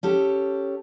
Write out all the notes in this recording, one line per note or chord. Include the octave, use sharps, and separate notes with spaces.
C#4 G4 A4